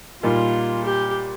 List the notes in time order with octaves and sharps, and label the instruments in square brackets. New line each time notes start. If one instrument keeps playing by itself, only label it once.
[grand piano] A#2 G3 A#3 D#4 [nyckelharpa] F4
[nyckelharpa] G4